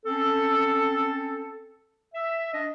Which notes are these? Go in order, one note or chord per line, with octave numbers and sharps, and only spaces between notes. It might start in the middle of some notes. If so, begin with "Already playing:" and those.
C4 C#4 A4
E5
D4 D#5